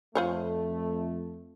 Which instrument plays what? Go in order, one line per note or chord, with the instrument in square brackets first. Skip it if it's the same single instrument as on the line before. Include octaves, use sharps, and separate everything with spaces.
[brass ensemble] F2 A3 [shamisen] F4 C5 C#5